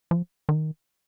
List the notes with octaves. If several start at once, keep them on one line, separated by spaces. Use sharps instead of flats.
F3
D#3